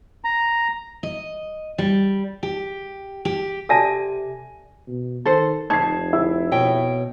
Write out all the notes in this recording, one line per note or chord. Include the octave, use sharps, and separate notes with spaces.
A#5
D#5
G3
G4
G4
C3 A4 D5 G#5 A5 A#6 D#7
B2
D#3 A4 C5
F1 D#4 A5 G#6 C7
E4 E6
B2 C#5 G5